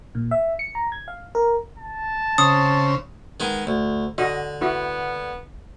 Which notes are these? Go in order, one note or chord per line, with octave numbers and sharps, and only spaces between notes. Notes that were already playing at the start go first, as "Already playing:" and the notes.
A#2
E5
C#7
A#5
G#6
F5
A#4
A5
C#3 C4 D#6
D#3 G#3 B3
D2
D3 F#4 D#5
B3 E4 F#4